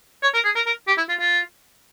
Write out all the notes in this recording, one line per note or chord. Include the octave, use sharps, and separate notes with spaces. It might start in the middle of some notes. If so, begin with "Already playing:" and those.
C#5
A#4
G#4
A#4
A#4
G4
E4
F4
F4